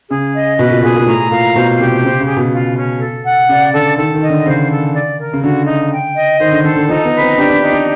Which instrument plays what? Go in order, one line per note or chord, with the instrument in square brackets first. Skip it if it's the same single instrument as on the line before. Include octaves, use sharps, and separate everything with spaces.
[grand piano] C#3 [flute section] G#4
[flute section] D#5
[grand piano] B2 [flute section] B4
[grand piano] A#2
[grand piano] A#2 [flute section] G#4
[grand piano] A#2
[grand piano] A2 [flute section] A#5
[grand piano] A#2 [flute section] F5
[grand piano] B2 [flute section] C5
[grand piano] C3 [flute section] G4
[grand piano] C#3 [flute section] C5
[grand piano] C#3
[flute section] G#4
[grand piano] B2
[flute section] F4
C#4
A4
F#5
[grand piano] C#3 [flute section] D5
[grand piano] D3 [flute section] A4
[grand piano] D#3 [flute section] A4
[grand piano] D#3
[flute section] D#5
[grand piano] D3
[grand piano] C#3 [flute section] C5
[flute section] A4
D5
A#4
[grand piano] C#3
[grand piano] D3 [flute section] F#4
[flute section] D#4
G5
D#5
[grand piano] D#3 [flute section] C5
[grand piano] D3
[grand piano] D3 [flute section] A4
[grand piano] D3
[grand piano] F3 [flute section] D#4
[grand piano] B3
[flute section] B4
[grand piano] C4
[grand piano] D4 [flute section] G4
[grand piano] D4
[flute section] D#4
[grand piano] D4